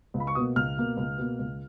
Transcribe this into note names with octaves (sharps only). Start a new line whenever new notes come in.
C#2
B5
C#6
B2 A#3 D#6
C#2 F6
B2 A#3
C#2
B2 A#3
C#2